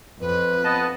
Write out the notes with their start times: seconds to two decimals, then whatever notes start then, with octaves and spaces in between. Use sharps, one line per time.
0.21 F2 B4
0.64 B3 D#5 A5